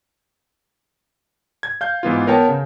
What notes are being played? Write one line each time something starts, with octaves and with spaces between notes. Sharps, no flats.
G#6
F5 G6
G#2 E3 B3 F4
B3 A#4 C#5 G5 A5
C#3